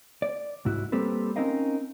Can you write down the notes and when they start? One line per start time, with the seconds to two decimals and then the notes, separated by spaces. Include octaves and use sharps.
0.22 D5
0.65 C2 G#2 E4 F#4
0.92 G3 A#3 C4 A4 B4
1.36 C4 C#4 D#4 A#4 D#5 F5